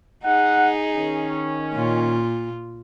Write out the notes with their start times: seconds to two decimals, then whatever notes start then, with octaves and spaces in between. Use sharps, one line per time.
0.24 D#4 G#4 F#5
0.93 D#3 C#4
1.73 A#2 F4